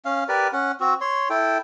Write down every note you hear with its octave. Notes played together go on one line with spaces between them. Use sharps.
C#4 F5
G4 A#4 B4 D5
C#4 F#5
C4 F#4
C#5 C6
E4 A4 G5